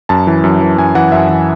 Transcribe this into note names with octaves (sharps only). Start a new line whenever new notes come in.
F#2 A5
E3
F#2
E3
F#2 G#5
E3 F#5
F#2 E5
E3